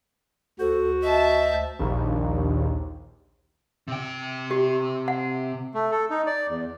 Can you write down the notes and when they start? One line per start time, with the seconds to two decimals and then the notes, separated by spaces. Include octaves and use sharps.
0.60 D2 F#4 A4 C5
1.03 D#5 E5 A5
1.79 A#1 D#2
3.88 C3 G5
4.51 G4
5.08 F#5
5.74 A3
5.91 A4
6.10 D#4
6.26 D5
6.49 E2